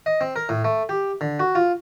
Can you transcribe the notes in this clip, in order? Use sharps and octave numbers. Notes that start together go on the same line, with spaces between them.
D#5
C4
A#4
A2
A3
G4
D3
F#4
F4